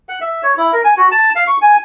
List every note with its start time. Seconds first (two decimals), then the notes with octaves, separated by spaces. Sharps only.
0.09 F#5
0.21 E5
0.43 C#5
0.57 E4
0.73 A#4
0.84 G#5
0.97 F#4
1.11 A5
1.35 F5
1.47 C#6
1.62 G#5